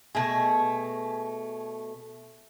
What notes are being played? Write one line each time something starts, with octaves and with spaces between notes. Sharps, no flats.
B2 A3 G#4